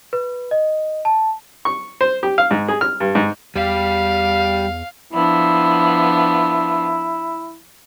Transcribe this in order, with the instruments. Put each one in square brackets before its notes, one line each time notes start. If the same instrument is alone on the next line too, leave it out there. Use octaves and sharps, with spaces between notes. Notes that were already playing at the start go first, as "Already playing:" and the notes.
[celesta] B4
D#5
A5
[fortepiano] C#6
C5
G4
F5
G#2
G#4
F6
G2
G#2
[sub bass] E2 [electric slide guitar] G3 [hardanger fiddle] F5
[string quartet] F3 B3 D4 [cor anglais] E4